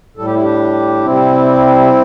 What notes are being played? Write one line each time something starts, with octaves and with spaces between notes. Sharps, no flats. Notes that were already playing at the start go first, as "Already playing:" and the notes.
A2 G3 A4
G4
E4
D4 G4
C3 G3 C4 E4